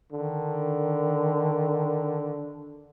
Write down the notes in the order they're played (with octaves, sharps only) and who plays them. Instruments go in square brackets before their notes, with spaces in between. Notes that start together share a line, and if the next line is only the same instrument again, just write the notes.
[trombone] D3 [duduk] D#3